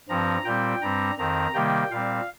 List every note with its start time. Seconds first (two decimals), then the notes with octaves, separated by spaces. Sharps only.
0.09 G2 F3 C4 A#5
0.45 A#2 G3 C4 G5
0.81 G2 G3 C4 A#5
1.18 F2 D#3 C4 A#5
1.54 C3 D#3 G3 A#3 G5
1.91 A#2 G3 C4 F5